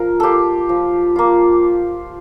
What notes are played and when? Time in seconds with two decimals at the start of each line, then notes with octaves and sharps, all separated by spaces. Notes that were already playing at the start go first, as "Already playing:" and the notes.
Already playing: F3 A#4
0.20 A#3 F4 G4 A4
0.69 F3
1.16 A#3 F4